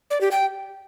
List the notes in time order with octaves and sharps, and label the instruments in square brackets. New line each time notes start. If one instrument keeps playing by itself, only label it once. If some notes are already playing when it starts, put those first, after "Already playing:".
[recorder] D5
G4
G5